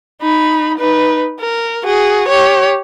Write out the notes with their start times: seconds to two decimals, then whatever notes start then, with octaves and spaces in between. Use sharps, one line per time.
0.21 D#4 B5
0.78 D#4 B4
1.40 A#4
1.84 F#4 G#4
2.28 G4 C#5